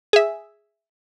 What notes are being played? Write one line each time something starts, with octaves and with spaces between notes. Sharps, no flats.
G#4 E5